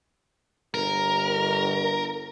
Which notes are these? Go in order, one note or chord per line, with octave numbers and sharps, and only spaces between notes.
G1 A#4